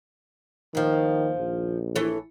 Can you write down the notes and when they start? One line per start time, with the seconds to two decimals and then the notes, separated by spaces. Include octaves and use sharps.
0.75 D#2 D#3 F3
1.38 A#1
1.95 E3 A4 C#5